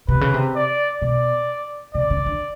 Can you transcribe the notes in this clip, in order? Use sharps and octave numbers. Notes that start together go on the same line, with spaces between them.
C3 B4
C#3
C3
D5
B2 D5
C3 D5
C#3
D3